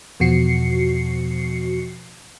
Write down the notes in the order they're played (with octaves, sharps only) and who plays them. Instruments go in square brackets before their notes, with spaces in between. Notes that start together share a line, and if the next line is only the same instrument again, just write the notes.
[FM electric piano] E2 B2 F3 F#4 C7 C#7